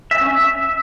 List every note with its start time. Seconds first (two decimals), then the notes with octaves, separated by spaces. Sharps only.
0.11 E5
0.21 C#4
0.31 E5